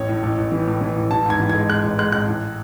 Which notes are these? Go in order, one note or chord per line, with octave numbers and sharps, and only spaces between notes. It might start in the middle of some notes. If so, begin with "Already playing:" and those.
Already playing: A1 C#4 C#5
A2
A1
A1
E3
A2
E3
A1
E3 A5
G#2 G#6
E3
G#3 G#6
G#3 F#6
A1
G#3 F#6
A1 F#6
A1